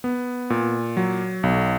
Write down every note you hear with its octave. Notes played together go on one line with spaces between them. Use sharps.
B3
A#2
F#3
B1